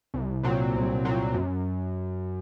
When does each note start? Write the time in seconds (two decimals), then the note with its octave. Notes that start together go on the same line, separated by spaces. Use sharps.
0.14 C2
0.43 A#2 F#3 C4
0.74 C2
1.05 A#2 F#3 C4
1.34 F#2